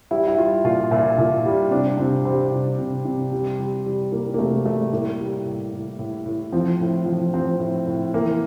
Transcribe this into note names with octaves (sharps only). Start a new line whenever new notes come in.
G3 E4
E4
G3 F4
A#2 F4
A#2 E4
A#2
G3
C3 D4
C3 C4
G3 C4
C3
C3
C3
G3
G3
G3
G3 A#3
A#3
C3 A3
G3 A3
A2 A#3
G3
A2
A2
A2
A2
F3 C4
A2
F3
F3 C4
A2
A2
E3 A#3